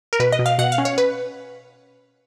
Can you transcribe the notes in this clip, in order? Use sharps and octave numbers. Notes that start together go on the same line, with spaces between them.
A#4
B2 B4
D#5
B2
F5
B2 F#5
F5
C#4
C#5
B4